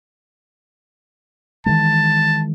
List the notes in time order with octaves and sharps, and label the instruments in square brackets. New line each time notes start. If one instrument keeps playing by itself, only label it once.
[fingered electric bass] D#3 E3 G#3 [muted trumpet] A5